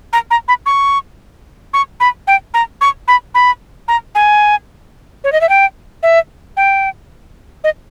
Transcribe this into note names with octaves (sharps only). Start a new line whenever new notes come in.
A#5
A#5
B5
C#6
C#6
B5
G5
A#5
C#6
B5
B5
A#5
G#5
C#5
D#5
E5
G5
E5
G5
D#5